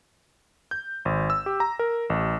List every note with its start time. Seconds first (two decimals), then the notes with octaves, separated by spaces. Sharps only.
0.71 G6
1.05 G#1
1.30 E6
1.46 G4
1.60 A#5
1.79 A#4
2.10 A1